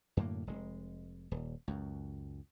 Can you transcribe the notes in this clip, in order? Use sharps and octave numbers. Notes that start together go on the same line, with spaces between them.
F#2 A2 D3 A#3
F1 G#3
D#1
C#2 F#2